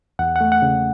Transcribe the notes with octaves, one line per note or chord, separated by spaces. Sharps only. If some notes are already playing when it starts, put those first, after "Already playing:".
E2 F#5
A3 F#5
F#5
C#3